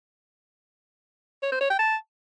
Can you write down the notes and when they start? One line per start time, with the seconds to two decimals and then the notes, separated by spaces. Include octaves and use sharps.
1.43 C#5
1.52 C5
1.61 C#5
1.70 G5
1.79 A5